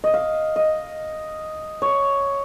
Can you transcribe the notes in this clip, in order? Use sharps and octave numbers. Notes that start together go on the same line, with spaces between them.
D#5
F5
D#5
C#5